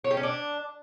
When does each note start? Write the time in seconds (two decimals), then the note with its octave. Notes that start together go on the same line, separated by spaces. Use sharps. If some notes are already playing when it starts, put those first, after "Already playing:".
0.04 C#5
0.11 G4
0.17 C#4
0.23 D4